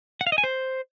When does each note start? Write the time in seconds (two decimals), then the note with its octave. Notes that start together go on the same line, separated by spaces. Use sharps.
0.21 F#5
0.27 F5
0.32 D#5
0.38 G#5
0.44 C5